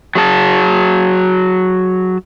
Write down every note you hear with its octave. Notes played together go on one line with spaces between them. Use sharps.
F#3 G#4 A5